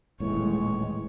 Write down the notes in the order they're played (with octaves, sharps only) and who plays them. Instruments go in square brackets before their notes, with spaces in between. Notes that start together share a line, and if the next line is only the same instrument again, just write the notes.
[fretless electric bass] D#1 A2 E3 [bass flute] G#3 [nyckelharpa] C#5